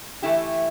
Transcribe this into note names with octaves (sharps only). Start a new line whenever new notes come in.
E3 A3 E4 G4